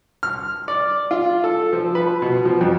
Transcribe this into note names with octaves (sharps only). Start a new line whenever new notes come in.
F6
D5
F4
A4
F3
B4
B2
F3
F2